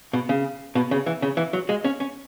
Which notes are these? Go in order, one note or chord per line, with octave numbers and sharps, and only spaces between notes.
B2
C#3
B2
C#3
E3
C#3
E3
F#3
G#3
C#4
C#4